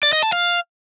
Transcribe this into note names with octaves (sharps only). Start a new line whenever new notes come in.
D5
D#5
A5
F5